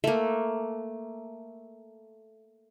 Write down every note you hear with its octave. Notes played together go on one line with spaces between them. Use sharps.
A3 A#3